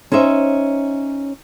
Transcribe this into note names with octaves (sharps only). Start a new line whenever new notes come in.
C#4 D#4 C5 E5